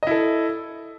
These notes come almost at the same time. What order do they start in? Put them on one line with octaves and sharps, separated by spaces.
D#5 E4 A4